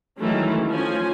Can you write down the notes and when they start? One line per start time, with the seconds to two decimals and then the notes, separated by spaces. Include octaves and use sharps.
0.18 D#3 E3 F#3 G#3 A3 C#4
0.68 F3 C#4 G#5